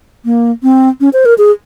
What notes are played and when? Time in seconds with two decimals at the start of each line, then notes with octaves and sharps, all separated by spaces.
0.25 A#3
0.63 C4
1.01 C#4
1.13 C5
1.25 A#4
1.38 G#4